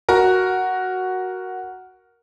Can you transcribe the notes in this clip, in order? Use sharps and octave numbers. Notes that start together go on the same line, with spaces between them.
F#4 A#4